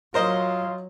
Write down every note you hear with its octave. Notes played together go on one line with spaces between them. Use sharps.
F#3 F4 A#4 C5 D#5